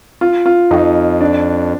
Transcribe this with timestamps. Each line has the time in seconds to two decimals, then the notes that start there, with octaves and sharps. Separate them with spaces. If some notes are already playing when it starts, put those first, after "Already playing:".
0.21 F4
0.46 F4
0.71 F2 D#4
1.21 D4